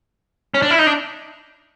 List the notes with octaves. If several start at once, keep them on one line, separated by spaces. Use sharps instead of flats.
C#4
D4
E4
D#4
D4